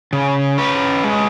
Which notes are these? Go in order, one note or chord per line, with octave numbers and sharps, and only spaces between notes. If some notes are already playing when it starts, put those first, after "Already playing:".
C#3
C#4 B4
G#3